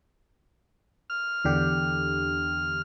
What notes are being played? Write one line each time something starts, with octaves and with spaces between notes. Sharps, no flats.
F6
E2 D3 G4